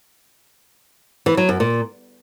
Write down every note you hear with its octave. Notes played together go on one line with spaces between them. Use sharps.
E3
F#3
F#2
A#2